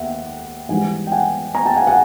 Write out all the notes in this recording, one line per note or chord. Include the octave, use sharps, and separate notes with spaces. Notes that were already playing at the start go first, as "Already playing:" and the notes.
Already playing: D#2 E5 F#5
G#2 E3 G3 F#5 G#5
G5
F#5 G#5
G#5 A#5
G5 A5
F#5 G#5
F#5 G#5